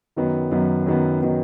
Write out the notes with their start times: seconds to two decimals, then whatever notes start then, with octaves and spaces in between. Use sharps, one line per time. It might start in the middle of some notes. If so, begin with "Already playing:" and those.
0.16 F#2 D#3 F#3 B3
0.51 F#2 D#3 F#3 B3
0.86 F#2 D#3 F#3 B3
1.21 D#3 F#3 B3